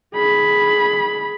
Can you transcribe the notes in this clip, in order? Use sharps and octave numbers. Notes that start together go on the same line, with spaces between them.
G#4 B5